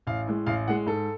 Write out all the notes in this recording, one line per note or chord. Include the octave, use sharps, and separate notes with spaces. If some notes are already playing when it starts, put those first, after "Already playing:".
A1 F5
A2 G#3
A1 F5
A2 G#3 F#5
G#2 A4